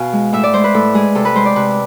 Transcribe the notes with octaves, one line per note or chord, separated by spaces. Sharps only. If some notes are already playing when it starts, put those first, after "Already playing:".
Already playing: B2 F5 G#5
G#3
A2 E5
D5
G#3 C5
B4
A2 A4
G#3 G#4
C3 A4
B4
G#3 C5
D5
C3 B4